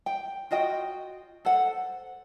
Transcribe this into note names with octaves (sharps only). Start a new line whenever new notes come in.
G5
F4 F#4 D#5 G5
A4 C5 F#5